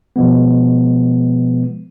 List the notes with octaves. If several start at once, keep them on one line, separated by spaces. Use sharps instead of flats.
B2 F3 G#3 B3